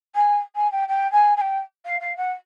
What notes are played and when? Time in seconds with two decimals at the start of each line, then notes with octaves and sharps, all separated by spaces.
0.15 G#5
0.55 G#5
0.72 G5
0.88 G5
1.12 G#5
1.36 G#5
1.41 G5
1.85 F5
2.00 F5
2.17 F#5